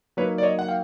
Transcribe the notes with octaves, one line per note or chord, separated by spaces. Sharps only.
F#3 A#3 D#4 B4 C#5
D5
C#5 D#5
F#5
F5 G5